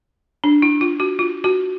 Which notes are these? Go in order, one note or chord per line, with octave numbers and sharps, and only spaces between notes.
D4
E4
F4
F#4
F4
F#4